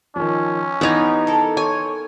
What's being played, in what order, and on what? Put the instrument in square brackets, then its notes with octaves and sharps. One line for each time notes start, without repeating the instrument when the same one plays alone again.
[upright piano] D#3 F3 [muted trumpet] C#4
[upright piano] E3 G#6 [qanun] B3 D#4 [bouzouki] G4
[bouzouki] A4 A#4
[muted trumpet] C#5 [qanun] G#5